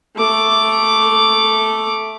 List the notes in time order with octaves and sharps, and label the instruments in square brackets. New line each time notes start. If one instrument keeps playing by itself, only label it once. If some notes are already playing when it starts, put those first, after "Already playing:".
[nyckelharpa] A3 D6